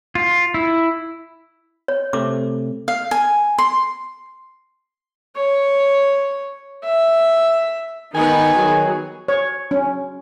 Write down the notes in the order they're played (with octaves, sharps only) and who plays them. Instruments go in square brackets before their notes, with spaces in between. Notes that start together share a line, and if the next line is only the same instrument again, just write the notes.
[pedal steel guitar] F4
E4
[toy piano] C#5
[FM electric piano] C3 A3 C4 [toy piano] D6
[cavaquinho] F5
G#5
C6
[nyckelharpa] C#5
E5
[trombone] D#3 [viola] B3 B4 [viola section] D#4 [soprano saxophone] G#5
[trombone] D#3 [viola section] F#3 G#4
[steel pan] C#5
C#4